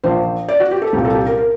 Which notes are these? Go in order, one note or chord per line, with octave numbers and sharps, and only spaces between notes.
A#1 A#2 C5
D5
F#4
G4
A4
C2 A#2 G4
A4
G4
A#4
A#4